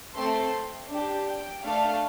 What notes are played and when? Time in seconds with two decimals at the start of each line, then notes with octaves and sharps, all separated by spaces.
0.15 A3 C4 A4 C6
0.90 D4 G4
1.26 G5
1.63 A3 D4 A4 F5